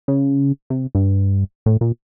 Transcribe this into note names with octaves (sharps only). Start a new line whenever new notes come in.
C#3
C3
G2
A2
A#2